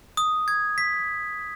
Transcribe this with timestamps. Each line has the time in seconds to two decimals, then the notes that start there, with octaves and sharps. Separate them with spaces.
0.17 D#6
0.48 G#6
0.78 B6